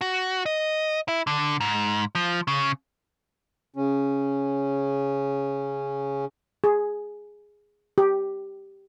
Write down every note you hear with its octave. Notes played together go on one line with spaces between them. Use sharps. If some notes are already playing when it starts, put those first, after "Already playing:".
F#4
D#5
E4
D3
G#2
F3
C#3
C#3 C#4
G#4
G4